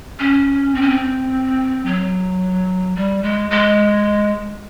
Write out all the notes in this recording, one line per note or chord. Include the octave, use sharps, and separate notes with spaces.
C#4
C4
C#4
C4
F#3
G3
G#3
G#3